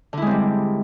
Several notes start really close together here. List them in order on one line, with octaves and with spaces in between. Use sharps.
D3 E4 G#3 C4 G3